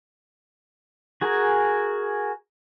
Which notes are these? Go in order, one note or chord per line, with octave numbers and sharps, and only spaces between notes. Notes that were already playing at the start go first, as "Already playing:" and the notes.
F#4 G#4 A#4 G#5